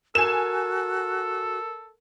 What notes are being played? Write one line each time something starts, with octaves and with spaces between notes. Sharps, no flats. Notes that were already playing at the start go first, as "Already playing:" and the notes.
F#4 A4 A#4 G#5 E7